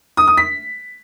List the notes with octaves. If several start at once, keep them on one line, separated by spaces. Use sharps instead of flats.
D#6
D#6
B6